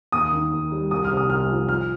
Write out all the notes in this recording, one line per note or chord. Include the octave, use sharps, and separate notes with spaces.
D#2 D#6
D#3
D#2
G3
C2 D#6
F6
C3
D#6
C2 F6
F3
F3 F6